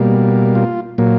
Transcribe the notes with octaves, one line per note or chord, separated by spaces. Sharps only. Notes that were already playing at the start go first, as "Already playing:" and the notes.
Already playing: B2 G3 A#3
F4
A#2 F#3 A#3